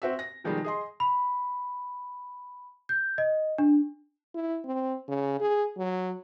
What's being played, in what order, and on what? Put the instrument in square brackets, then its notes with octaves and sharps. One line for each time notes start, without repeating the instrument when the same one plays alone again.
[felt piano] C4 F#4 E5
A#6
B2 D#3 F3 G3 G#3
G#4 D#5 C6
[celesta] B5
G6
D#5
D4
[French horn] E4
C4
C#3
G#4
F#3